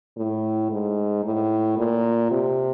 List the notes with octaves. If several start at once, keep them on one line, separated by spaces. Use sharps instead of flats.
A2
G#2
A2
A#2
C3